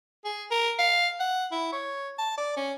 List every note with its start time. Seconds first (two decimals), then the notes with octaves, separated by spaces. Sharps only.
0.25 G#4
0.51 A#4
0.79 F5
1.20 F#5
1.52 E4
1.72 C#5
2.18 A5
2.38 D5
2.57 C#4